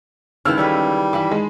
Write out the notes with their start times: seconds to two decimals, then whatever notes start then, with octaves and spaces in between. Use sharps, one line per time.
0.45 C#2 D#3 E3 A5 E6 F6
0.58 G3 A4 B4 C#5
1.13 E3 E4 A5 B5
1.31 G#3